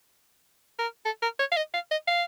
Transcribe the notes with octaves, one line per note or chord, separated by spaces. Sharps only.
A#4
A4
A#4
C#5
F5
D#5
F5
D#5
F5